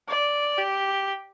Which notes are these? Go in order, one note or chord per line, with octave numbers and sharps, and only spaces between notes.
D5
G4